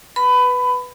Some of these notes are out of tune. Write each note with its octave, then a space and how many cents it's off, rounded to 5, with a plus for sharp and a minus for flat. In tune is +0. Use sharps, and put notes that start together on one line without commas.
B4 +0 B5 +20